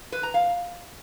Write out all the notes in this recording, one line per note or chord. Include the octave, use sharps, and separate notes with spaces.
B4
A#5
F5